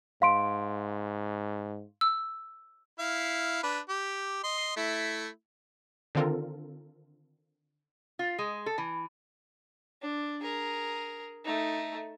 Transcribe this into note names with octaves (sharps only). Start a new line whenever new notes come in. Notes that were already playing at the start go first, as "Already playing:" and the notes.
G#2 F5 C6 D7
E6
E4 F5
D4 B4
G4
D#5 C6
A3 E4
D3 D#3 C4 F4 A4 A#4
F4
G#3
A4
E3
D4
G#4 A#4
A3 D#4